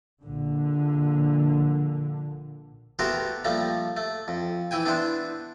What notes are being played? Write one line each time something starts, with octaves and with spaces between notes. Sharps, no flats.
A#1 D3
A3 B3 F#4 G4 A#4 C5
F3 G3 A3 A#3
A3
F2
E3 E4 G5 G#5
B3 D4 E4 C5